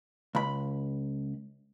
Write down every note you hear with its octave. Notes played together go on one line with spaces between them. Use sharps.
C#2 B5